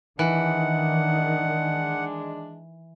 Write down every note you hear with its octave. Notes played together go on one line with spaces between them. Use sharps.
D#3 E3 G#3 D4 F#5